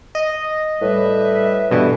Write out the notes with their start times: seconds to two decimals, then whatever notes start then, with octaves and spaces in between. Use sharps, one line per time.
0.15 D#5
0.82 A2 G3 B4 E5
1.71 G2 B2 D3 E3